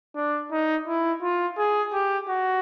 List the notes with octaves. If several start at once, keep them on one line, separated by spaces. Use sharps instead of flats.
D4
D#4
E4
F4
G#4
G4
F#4